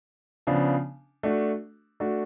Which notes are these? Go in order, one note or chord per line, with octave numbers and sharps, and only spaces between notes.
C#3 F3 B3 D4
A3 D4 F#4
A3 D4 F#4